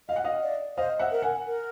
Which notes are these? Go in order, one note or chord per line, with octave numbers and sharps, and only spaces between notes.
D#5 F5
F#5
D#5 F5
D5
C5 D#5 F5
E5 F#5
A#4
F#5 G#5
A#4